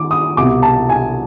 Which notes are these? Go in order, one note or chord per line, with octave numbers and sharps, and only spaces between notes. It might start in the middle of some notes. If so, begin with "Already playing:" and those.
Already playing: D#3 D6
D#6
C2 B2 D6
A5
G#5